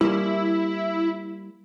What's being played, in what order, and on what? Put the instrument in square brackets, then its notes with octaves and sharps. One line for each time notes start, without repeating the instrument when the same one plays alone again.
[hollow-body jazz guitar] G3 A#3 [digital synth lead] E4